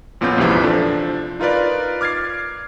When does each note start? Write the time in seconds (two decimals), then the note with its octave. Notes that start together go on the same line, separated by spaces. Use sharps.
0.21 F2 A#2 B3 C#4 F4 G6
0.38 A#1 E2 G#2 C3 E3 F3
0.63 F3 D4 A4
1.40 D#4 F4 A#4 B4 D5
2.01 D6 F6 G#6 A6 C7